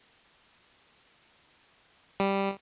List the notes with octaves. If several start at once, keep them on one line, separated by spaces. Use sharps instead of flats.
G3